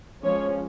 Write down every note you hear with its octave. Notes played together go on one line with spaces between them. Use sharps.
F3 G#3 C#4 C#5